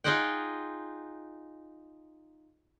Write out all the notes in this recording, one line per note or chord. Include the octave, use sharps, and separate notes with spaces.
D#4 F4 G#4 D#5 F#5 G5